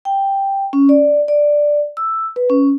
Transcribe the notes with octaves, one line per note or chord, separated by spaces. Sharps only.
G5
C#4
D5
D5
E6
B4
C#4